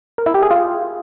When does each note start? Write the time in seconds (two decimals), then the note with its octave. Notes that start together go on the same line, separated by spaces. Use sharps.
0.18 A#4
0.26 E4
0.34 G4
0.43 G#4
0.51 F4